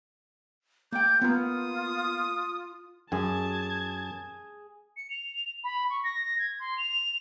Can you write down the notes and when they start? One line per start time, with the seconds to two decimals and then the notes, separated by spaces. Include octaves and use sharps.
0.92 A#3 G5 D6 G6
1.22 A#3 B3 F4 D#6
3.12 F#2 G#4 A5 G#6
4.96 C#7
5.10 F7
5.63 B5
5.89 C#6
6.03 A#6
6.38 G#6
6.59 C6
6.78 F7